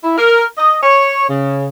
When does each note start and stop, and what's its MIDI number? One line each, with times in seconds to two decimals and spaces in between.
0.02 0.14 64
0.17 0.42 70
0.57 0.75 75
0.83 1.27 73
1.28 1.66 49